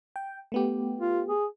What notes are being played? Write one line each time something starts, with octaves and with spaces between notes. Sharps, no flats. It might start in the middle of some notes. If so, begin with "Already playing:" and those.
G5
A3 B3 G4
F4
G#4